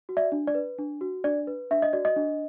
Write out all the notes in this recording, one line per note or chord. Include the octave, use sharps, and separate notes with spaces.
F#4
D5 E5
D4
D5
B4
D4
F#4
D4 D5
B4
D4 E5
D#5
F#4 D5
D#5
D4